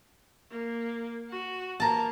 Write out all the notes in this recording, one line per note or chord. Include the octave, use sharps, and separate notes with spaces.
A#3
F#4
A#3 A5 A#5